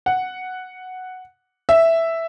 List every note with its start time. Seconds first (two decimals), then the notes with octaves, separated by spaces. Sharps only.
0.06 F#5
1.69 E5